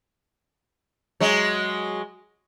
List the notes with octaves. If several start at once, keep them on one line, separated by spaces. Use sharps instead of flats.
F#3 G#3